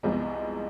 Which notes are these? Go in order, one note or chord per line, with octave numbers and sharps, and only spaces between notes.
C2 C3 F3 G#3 B3